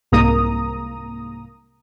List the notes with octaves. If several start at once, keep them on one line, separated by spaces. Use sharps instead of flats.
C2 G#2 A#3 A#5 D#6